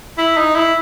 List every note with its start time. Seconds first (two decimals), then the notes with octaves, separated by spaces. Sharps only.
0.18 E4
0.37 D#4
0.56 E4